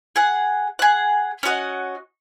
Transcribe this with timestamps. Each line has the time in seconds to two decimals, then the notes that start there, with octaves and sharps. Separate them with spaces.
0.16 G#4 F#5
0.79 G#4 F#5
1.43 C#4 F#4 D#5 F#5